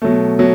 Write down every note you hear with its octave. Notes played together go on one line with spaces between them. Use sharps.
B2 F#3 A3
B2 F#3